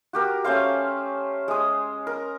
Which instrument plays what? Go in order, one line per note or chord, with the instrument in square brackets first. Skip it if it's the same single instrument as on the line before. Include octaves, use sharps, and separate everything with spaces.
[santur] F#4 G4 A#4
A3 C#4 C5 F5
G#3 D#6
A#4